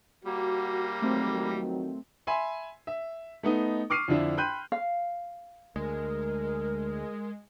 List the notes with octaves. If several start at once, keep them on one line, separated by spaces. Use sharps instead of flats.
G3 A#3 F#4
F2 D#3 F#3 A3 C4
E5 G#5 B5 C6
E5
A3 B3 D#4 D#5
C#6 D6 F6 C7 D#7
F2 D3 D4 E4 E5
G5 B5 C6 F#6 G6 D#7
F5
D2 G#3 A#4